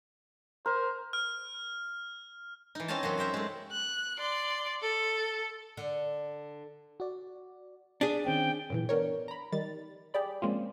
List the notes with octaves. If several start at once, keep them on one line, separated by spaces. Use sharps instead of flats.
A#4 C5
F6
E3 D#4
C4 C#4 D#5 F5 G#5 A5
F#2 C3 F#4 C6
C4 A#4 C5 E5
G#3 A3
F#6
D5 C6
A4
D3
F#4 D5
D4 G#4 B6
D#3 C4 C#4 G5
F#2 A#2 E3
B3 D4 A#4 C#5
A#5 B5
D#3 G3 A6
G4 G#4 D5 B5
F3 G#3 A#3 C4 C#4 F4